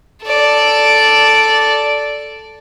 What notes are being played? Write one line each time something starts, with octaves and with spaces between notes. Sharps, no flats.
A4 D5